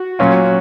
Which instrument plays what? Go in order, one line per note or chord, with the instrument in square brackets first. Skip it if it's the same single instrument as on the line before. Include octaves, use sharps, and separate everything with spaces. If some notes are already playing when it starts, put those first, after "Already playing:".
Already playing: [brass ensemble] F#4
[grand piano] A#2 F#3 C#4 F4